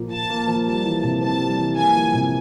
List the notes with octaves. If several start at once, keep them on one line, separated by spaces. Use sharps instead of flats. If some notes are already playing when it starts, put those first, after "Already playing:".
Already playing: A#2 F3 A#3
A#2 A5
A#3
F3
G3 A5
E3
C3
C4 A5
G3
E3
A#3 G#5
F3
C3